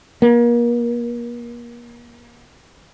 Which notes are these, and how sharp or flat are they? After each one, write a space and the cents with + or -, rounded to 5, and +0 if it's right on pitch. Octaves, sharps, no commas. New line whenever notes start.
A#3 +35